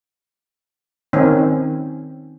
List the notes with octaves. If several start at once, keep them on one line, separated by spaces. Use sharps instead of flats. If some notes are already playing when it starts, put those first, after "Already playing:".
D#3 C4 C#4